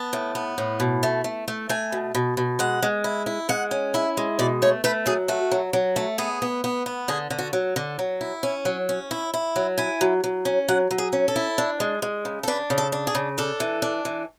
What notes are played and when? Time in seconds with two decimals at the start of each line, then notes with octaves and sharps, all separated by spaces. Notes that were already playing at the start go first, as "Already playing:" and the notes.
Already playing: B3 A5
0.13 A2
0.35 B3
0.58 A2
0.80 B2
1.03 A3
1.24 A3
1.48 A3
1.69 A3 G#5
1.92 B2
2.15 B2
2.37 B2
2.59 G#3 F#5
2.82 G#3
3.04 E4
3.26 E4
3.49 G#3 F#5
3.71 C#4
3.94 E4 E5
4.17 G#3
4.39 B2 D5
4.62 A3 C#5
4.84 A3 B4
5.06 F#3 G#4
5.28 A3 F#4
5.52 F#3
5.73 F#3
5.96 A3
6.18 B3 G#4
6.42 B3
6.64 B3
6.86 B3
7.08 D3 G#4
7.30 D3
7.38 F#4
7.53 F#3
7.76 D3
7.99 F#3
8.21 E4
8.43 C#4
8.65 F#3
8.89 C#4
9.11 E4
9.34 E4
9.56 F#3
9.78 E4 G#5
10.01 F#3
10.24 F#3
10.45 C#4
10.68 F#3 F#5
10.91 F#3
10.98 G#4
11.13 C#4
11.28 A4
11.36 E4
11.58 D4
11.80 G#3
12.02 G#3
12.25 C#3
12.43 A4
12.48 D4 B4
12.70 C#3
12.78 A4
12.92 D4
13.07 G#4
13.15 C#3
13.38 D4 A4
13.60 E3
13.82 D4
14.05 E3